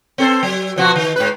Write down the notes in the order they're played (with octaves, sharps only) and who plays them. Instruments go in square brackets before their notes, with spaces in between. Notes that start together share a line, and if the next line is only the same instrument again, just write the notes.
[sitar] C4 A4 C5
F#3
B2 F3 F#4
D#3
G#2 B4